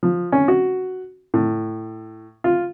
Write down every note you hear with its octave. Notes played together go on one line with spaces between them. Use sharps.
F3
C#4
F#4
A2
F4